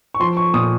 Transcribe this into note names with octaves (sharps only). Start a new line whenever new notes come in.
C#6
F3 C6
C#6
A#2 D#6